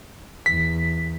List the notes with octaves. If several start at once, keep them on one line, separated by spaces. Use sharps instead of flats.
E2 B6